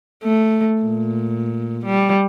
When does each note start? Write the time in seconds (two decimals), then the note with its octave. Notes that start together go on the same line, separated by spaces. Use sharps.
0.24 A3
0.82 A#2
1.86 G3